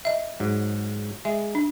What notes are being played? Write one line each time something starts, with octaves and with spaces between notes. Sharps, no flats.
D#5 E5
G#2 F#3
G#3 E5
D4